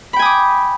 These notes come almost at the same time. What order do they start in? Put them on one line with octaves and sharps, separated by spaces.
B5 G5 G#5 D#6 D6